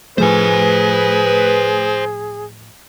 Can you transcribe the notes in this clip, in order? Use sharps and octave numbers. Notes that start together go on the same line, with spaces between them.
A2 F3 A3 G#4 B4 C5 G#5